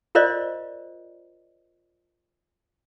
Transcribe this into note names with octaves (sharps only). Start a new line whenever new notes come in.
F4 A#4 C5 D5 D#5